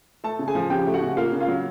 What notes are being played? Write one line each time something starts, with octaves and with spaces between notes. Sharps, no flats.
A3 A4 A5
C#3
G#4 G#5
F3
C#3 G4 G5
A3
F#4 F#5
C#3
A#3 F4 F5
C#3
F4 F5
F#3